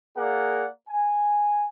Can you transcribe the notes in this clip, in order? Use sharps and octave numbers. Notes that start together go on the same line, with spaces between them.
A#3 G#4 A#4 D5 F#5
G#5